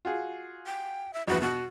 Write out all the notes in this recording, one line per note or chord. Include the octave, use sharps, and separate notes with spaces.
F4 F#4 G#4
G5
E5
A#1 E2 F#4 B4
B2 F#4